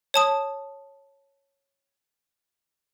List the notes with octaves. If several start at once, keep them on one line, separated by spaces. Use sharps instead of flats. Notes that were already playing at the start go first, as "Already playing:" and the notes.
C#5 A5 D#6